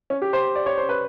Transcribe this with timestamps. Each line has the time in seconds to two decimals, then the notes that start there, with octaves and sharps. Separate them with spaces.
0.10 C#4
0.22 G4
0.33 C5
0.56 D5
0.66 C#5
0.78 C5
0.89 B4